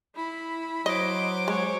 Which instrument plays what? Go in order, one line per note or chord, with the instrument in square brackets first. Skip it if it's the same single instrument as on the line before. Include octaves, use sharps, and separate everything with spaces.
[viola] E4 B5
[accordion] F#3 [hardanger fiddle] C5 D6 [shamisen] D#5
[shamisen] G#3 [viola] C#5